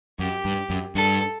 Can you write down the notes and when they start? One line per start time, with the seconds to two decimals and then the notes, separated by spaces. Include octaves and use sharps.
0.19 F#2 G4
0.45 G2
0.70 F#2
0.95 G2 A4